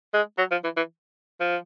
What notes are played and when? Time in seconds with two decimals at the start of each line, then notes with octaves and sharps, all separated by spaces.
0.14 G#3
0.38 F#3
0.51 F3
0.64 E3
0.77 E3
1.41 F3